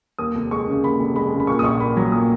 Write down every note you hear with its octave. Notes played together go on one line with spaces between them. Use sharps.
D#2 D#6
F1
G#3 C#6
C#3
D#2 B5
F1
G#3 B5
C#3
B5
A#2 C#6
D#6
A#1 C#6
A#3 B5
F#3
A#2 D#6